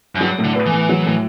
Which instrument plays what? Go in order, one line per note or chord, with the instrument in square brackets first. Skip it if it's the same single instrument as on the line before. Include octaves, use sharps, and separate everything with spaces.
[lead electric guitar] F#2
[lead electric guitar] G2 [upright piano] F#3
[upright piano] A2
[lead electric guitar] D3
[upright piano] B3
[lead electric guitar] E3
[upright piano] A2
F#3
A2